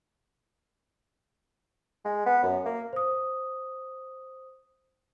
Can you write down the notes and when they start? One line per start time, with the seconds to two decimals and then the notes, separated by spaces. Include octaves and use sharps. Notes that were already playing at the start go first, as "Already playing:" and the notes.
2.05 G#3
2.26 B3
2.43 F#2
2.66 A#3
2.93 C5 D#6